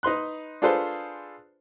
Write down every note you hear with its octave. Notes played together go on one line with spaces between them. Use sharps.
D#4 B4 C6 F#6
D4 F4 G#4 A4 B4 C5